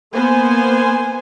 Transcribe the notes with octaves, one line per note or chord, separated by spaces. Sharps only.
A#3 B3 C5 G#5